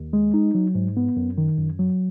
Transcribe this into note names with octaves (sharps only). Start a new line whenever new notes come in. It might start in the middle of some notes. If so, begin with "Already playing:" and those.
Already playing: D#2
G#3
D#4
F#3
G#2
B3
F#2
D#3
F#2
F#3